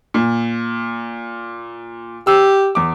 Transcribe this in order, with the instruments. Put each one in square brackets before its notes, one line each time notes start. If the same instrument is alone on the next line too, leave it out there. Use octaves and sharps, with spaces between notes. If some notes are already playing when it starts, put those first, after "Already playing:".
[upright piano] A#2
[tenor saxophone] G4 [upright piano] E6
[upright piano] E2 D6